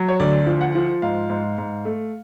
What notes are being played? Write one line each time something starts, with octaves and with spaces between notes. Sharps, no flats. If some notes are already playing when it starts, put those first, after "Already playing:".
Already playing: F#3
C#5
D2 D5
F3
F#5
F3
G#2 F5
G#2
G#2
A3